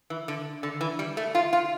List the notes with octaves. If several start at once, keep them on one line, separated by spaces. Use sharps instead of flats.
E3
D3
D3
E3
G3
A3
F4
F4